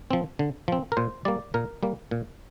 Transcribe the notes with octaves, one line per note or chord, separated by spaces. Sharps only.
F3 C4
D3
F3 C4
A#4
A#2 C5
G3 A#3 D5
A#2 A#4
G3 A#3
A#2